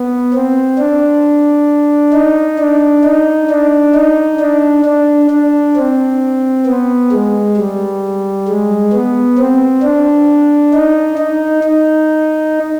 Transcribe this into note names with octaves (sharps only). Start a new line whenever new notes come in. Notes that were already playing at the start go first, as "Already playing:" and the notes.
Already playing: B3
C4
D4
D#4
D4
D#4
D4
D#4
D4
D4
D4
C4
B3
G#3
G3
G#3
B3
C4
D4
D#4
D#4
D#4